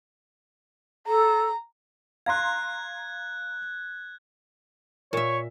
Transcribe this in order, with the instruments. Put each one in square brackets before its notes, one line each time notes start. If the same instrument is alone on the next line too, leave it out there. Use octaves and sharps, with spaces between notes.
[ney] A4 [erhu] A#5
[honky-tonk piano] F5 A#5 C6 [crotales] F#6 G#6
[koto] A#2 E5 [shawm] C#5